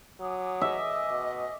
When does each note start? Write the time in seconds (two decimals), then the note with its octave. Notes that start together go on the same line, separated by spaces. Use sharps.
0.20 F#3 G#5 D6 D#6
0.61 D#5 E5
1.10 B2